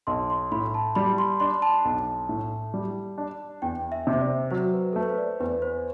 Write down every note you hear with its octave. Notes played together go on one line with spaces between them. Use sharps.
B1 C6
C6
A2 B5
A5
G3 B5
C6
D4 C6
A5
B1
A2
G3
D4
E2 G5
E5
C3
C5
D5
F#3 C5
B4
A3 A4
B4
C5
D5
E2 B4
C5